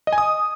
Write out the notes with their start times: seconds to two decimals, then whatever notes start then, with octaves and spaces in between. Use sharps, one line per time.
0.07 D#5
0.13 G#5
0.18 D#6